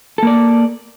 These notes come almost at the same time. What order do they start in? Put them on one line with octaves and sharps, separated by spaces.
A4 A#3 D5